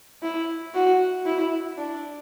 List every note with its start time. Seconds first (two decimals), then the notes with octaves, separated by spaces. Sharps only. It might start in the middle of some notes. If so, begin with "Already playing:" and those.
0.22 E4
0.74 F#4
1.26 E4
1.78 D4